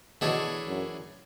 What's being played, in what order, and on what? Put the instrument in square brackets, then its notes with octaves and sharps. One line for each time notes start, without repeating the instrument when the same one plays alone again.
[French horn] B2 [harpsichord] E3 A3 D4 G#4 C#5
[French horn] F#2